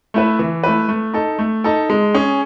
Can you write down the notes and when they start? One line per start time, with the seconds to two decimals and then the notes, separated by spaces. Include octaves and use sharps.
0.14 A3 E4 B4
0.39 E3
0.64 A3 E4 B4
0.89 A3
1.14 D#4 A4
1.39 A3
1.64 D#4 A4
1.90 G#3
2.14 C#4 G#4